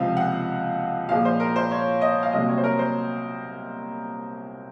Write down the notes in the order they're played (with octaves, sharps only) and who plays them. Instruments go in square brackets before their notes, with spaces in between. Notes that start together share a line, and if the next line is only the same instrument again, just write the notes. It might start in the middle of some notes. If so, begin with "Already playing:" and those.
Already playing: [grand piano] C#2 C3 F3 F5
F#5
A#2 F3 G#3 F5
C5
A#4
C5
C#5
D#5
F5
C2 C3 F#3 A#3 D#5
C#5
C5
A#4
C5